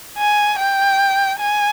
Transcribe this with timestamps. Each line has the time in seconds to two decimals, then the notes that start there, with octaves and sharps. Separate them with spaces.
0.18 G#5
0.59 G5
1.40 G#5